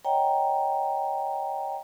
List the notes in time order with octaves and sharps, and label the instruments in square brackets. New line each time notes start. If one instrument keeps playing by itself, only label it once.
[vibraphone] C#5 D#5 F#5 G5 A#5